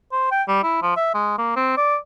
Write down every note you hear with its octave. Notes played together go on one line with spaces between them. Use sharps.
C5
G5
G3
E4
F3
E5
G#3
A#3
C4
D5